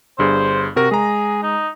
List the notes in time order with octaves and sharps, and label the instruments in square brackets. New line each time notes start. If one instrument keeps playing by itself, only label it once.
[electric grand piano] G1 G2 G#4 [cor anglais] C5
[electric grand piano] C3 A#4 A#6 [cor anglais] F#4
[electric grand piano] G#3 A#5 [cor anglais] G#4
[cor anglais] D#4